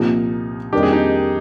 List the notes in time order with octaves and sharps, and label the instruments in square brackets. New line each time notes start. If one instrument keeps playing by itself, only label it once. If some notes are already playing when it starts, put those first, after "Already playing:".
Already playing: [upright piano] C2 A#2 F3 [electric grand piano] D#4
[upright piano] F2 D#3 G3 A#3 D4 [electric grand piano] G4
[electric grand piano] G#4
D#4 G4